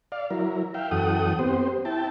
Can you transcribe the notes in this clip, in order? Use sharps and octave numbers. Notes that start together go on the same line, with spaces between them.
D5 F5
F#3 E4 A#4
E5 F5 G5
F#2 E3 A4 F#5 G5 D#6
B3 C4 G4 C5
E4 G5 A5